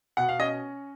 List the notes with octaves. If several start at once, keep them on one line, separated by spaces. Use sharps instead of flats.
B2 F#5
F5
C#4 D#5